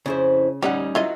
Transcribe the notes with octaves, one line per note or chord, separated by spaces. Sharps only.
F2 C#3 E4 C5
D2 G3 C#4 D#4 G4 F#5
D#3 F#3 E4 F4 D#5